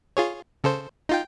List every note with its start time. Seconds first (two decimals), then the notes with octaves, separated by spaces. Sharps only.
0.17 F4 G#4 C#5
0.64 C#3 A4 C5
1.09 D#4 F4 G5